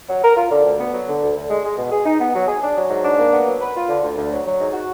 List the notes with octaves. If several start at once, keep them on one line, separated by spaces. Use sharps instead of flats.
F#3
A#4
F4
D3
D2
B3
F#3
D3
D2
D2
G#3
G#3
B2
G#4
D#4
B3
F#3
G#4
D4
F#3
G#2
D4
A#3
B3
F#3
B4
F4
D3
D2
D2
F#3
F#3
G#2
F#4